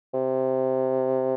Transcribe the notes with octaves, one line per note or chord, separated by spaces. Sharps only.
C3